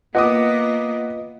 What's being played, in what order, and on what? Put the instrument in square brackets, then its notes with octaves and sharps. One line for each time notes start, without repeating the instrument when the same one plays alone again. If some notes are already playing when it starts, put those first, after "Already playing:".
[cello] A#3 B3 [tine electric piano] F4 B4 D#5 [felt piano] F#5 D6 D#6